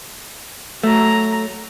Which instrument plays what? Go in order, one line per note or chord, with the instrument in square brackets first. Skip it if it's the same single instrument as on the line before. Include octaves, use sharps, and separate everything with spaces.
[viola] F#3 A#5 [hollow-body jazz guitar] A3